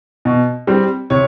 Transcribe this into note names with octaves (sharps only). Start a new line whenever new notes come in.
B2
G3 C4
C3 C#5